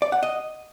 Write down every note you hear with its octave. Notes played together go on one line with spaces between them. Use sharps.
D5
F#5
D#5